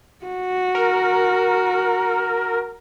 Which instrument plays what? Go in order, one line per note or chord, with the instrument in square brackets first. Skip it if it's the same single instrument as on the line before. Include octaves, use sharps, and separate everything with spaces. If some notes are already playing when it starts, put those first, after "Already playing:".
[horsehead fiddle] F#4
[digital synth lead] A#4